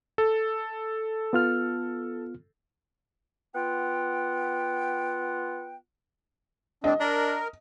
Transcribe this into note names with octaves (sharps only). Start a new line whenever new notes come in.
A4
B3 F4 F6
B3 F4 F#5 G5
C4 D4 D#5
D4 A#4